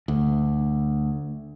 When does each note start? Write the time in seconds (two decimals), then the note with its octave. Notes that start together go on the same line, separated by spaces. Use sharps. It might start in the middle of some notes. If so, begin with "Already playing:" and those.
0.08 D2